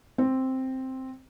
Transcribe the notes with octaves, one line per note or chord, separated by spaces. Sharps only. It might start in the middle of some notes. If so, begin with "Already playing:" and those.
C4